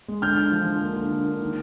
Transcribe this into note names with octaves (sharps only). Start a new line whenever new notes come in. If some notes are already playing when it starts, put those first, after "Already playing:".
G#3
D3 F6 G6
D3
F3
D3
A#3
D3
D3
A#3
D#3